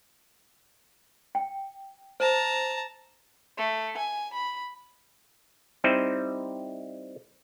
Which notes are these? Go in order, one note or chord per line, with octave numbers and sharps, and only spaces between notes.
G5
C5 A5 A#5
A3
G#5
B5
G3 C4 D#4 E4 C5